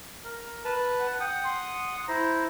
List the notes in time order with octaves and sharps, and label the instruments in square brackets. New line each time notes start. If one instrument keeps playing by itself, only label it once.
[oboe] A#4
[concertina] B4 A5
[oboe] F#5
[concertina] F#5 D#6 [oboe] G5
[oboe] C6
[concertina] E4 C5 [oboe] A#5